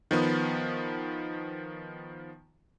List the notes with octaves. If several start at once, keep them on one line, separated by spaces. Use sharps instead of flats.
D#3 F3 B3